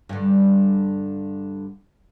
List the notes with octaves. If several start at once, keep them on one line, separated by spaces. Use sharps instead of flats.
G2 D3